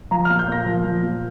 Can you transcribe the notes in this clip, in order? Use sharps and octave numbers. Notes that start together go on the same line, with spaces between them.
F3 A#5
A#2 F6
G6
A#2 A#6
F3
F3
A#2